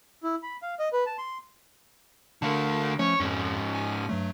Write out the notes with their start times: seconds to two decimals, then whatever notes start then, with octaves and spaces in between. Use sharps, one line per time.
0.23 E4
0.43 B5
0.62 F5
0.79 D#5
0.93 B4
1.06 A5
1.18 C6
2.42 D3 A3 A#4 F5 A5
2.99 F3 A3 C#4 C#5
3.20 F2 G#2 C#4
3.74 G#5
4.09 G2 F#3 A3